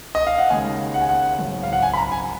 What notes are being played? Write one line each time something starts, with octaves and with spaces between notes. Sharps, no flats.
D#5
F5
F#5
D#2 C#3 G#3 G#5
F#5
G#5
F#5
G#1 F#2 C#3
F5
F#5
G#5
B5
A#5
G#5